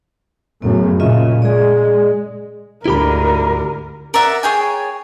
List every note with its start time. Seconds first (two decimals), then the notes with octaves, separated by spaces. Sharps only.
0.62 F#2 A2 C#3 B3
1.00 A#2 C#3 F4 D#5 E5
1.42 G#3 G#4 D5
2.86 D2 G#2 D3 E4 G4 A#4 B5
4.14 A#4 D5 E5 F#5
4.43 G#4 C#5 G5 G#5